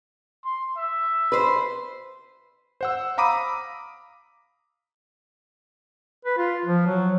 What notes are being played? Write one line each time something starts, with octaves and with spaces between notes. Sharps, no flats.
C6
E5
B4 C5
C5 F#5 E6
F5 A#5 B5 D6 D#6 D#7
B4
F4
F3
F#3